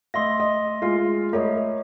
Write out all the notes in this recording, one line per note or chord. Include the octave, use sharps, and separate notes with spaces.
A3 D#5 E5 C6 A#6
D#5
G#3 F4
A3 A#4 C#5 D#5